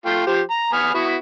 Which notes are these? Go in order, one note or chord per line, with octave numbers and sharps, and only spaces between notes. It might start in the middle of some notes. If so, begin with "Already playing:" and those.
A3 F4 G5
F3 G4 C5
A#5
B3 G#5 F6
B3 E4 F#4